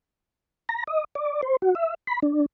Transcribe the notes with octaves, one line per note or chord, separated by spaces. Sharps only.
A#5
D#5
D5
C5
F#4
E5
B5
D4